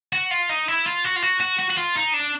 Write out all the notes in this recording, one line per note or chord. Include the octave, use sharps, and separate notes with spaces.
F#4
F4
D#4
E4
F4
F#4
F4
F#4
F#4
F#4
F#4
F4
D#4
D4